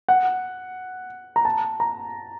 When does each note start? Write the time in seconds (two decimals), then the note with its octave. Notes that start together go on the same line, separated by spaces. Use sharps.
0.08 F#5
1.36 A#5
1.45 A5
1.80 A#5